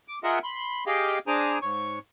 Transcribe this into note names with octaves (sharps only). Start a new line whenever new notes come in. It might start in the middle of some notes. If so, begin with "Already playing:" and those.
D6
F4 G#4 A#4 D#5 E5 F#5
B5 C6
G4 G#4 D#5 F5 G5
D4 G#4 C5 G#5 A#5 D6
G#2 C#5 C#6